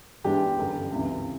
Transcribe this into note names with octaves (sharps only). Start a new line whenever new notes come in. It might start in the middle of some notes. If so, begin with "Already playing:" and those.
G#2 E3 G#3 B3 D4 G4
G1 F#2 D3
C#2 C3 E3